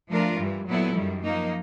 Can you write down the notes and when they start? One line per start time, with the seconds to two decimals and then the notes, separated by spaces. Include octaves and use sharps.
0.09 F3 A3 D4 F4 A#4
0.38 G2 E3 G3
0.67 A#2 F#3 B3 E4 A4
0.95 F#2 D#3 G3
1.23 F3 A#3 D#4